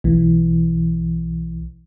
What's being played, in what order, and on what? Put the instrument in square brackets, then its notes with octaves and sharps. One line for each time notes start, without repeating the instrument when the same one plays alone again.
[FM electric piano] B1 E3